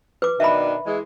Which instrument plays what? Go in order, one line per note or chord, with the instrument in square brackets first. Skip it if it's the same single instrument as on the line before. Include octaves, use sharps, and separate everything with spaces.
[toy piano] B4 D6
[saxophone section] B2 D#3 D4 [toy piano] E5 B5
[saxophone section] E3 G#3